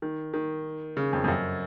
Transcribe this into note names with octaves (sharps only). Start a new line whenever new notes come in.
D#3
D#3
C#3
F2
F2
F#2